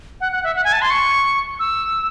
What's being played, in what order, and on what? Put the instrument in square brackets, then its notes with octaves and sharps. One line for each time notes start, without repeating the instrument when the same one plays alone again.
[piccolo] F#5
F#5
E5
F#5
G#5
A5
C6
C#6
E6